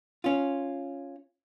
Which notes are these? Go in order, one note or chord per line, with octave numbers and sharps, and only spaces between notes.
C#4 F4